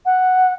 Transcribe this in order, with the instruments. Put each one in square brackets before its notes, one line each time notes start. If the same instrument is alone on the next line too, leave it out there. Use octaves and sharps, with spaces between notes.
[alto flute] F#5